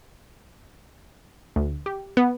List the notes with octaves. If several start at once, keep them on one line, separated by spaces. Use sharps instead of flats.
D2
G4
B3